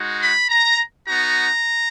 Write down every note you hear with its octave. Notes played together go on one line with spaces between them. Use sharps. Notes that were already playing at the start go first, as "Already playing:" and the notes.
Already playing: G#3 D#4 F#4
B5
A#5
B3 D#4 F#4 A#5